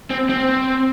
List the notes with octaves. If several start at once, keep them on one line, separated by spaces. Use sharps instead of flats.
C4
C4